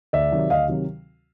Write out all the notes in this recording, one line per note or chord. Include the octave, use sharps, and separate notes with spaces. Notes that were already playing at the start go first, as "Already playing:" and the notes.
D2 D5 E5
C3 D#3 F#3
D2 D#5 F5
C3 D#3 F#3